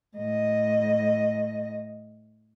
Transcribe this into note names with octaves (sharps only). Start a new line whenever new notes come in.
A2 D#5